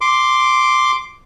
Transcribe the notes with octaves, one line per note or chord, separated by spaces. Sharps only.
C6 D6